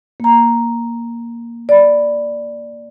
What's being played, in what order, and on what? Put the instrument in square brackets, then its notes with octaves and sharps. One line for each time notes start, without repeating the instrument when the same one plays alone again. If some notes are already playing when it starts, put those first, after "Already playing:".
[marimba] A#3 A#5
D5 B5